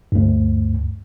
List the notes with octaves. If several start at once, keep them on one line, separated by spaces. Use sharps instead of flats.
D2 G2